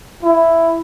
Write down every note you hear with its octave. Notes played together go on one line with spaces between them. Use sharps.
E4